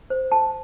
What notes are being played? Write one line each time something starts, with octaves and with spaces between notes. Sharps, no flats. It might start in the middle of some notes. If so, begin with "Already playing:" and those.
C5
A5